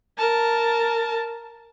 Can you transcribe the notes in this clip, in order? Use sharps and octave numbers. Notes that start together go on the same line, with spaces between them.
A#4 A5